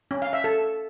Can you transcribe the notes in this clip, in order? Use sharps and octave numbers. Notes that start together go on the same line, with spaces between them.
C#4
F5
E5
A4